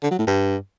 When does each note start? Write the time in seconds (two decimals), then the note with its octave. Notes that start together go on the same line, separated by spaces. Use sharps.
0.03 D3
0.11 F#3
0.19 A2
0.27 G2